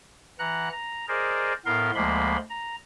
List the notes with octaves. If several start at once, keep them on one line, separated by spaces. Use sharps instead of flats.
E3 F#5 A#5 F#6
A#5
G#4 A#4 C5 D5 D#5
A2 B3 A#4 F5 C6
D2 F3 G#3 A#3 B5 C6
A#5